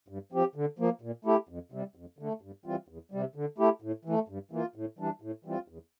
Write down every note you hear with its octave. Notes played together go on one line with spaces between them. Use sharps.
G2
F3 C4 G4
D3
F3 A#3
A#2
A3 E4 G4
F2
C3 G3
F2
D3 A3
G2
E3 G3 C4 F4
E2
C3 G3
D3
A3 E4 G4
A2
E3 A3
G2
E3 A#3 F4
A2
E3 G3 D4
A2
E3 G3 C4 F4
E2